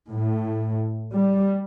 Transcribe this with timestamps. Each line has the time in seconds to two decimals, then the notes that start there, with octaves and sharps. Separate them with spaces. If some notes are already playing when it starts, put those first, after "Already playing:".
0.11 A2
1.14 G3